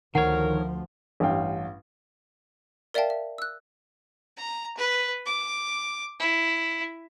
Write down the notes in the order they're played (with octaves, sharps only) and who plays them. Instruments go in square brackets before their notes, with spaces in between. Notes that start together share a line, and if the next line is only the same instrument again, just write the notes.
[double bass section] D2 F3 [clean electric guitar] D#3 C#5 [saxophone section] A#4 [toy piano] F#5
[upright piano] A1 G2 F5 G5
[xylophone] A#4 D5 E5 F5 G5 A5
E5
E6 F#6
[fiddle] A#5
B4
D6
E4